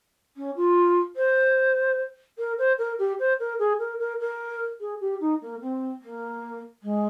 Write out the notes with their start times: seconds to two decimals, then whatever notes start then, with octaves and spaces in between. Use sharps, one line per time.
0.36 C#4
0.56 F4
1.16 C5
2.38 A#4
2.58 C5
2.78 A#4
2.99 G4
3.19 C5
3.39 A#4
3.59 G#4
3.79 A#4
3.99 A#4
4.20 A#4
4.80 G#4
5.00 G4
5.20 D#4
5.41 A#3
5.61 C4
6.01 A#3
6.83 G#3